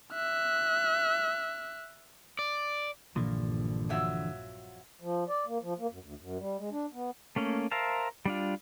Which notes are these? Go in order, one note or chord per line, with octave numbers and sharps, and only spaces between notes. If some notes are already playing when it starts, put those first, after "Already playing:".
E5 F#6
D5
A#1 G2 A#2 D3 E3 F3
F2 F#3 E5
F3
D5
A#3
F3
A#3
F#2
D2
F#2
G3
G#3
D4
B3
A3 A#3 C#4
A#4 C5 E5 F5 A5
G3 D4 F4